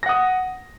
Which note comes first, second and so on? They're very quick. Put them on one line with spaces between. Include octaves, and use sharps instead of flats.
A#6 F#5 D#6